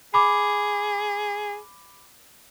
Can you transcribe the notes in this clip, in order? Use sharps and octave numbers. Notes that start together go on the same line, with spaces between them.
G#4 B5 D6